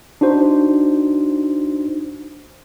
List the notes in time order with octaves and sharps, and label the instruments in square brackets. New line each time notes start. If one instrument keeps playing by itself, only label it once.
[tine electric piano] D4 D#4 F#4 C5